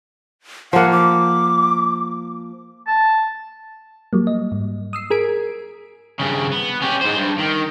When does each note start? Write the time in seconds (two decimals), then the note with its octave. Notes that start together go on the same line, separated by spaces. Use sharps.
0.73 F3 A#3 F#5
0.91 D6
2.87 A5
4.13 F#3 G3 A#3
4.27 D#5
4.52 G#2
4.93 D#6 E6 C7
5.10 G#4 A#4 G#6 B6 D7
6.19 G2 C#3
6.52 B3
6.82 C#4 G4
7.01 G#2 C5
7.17 G2
7.39 D#3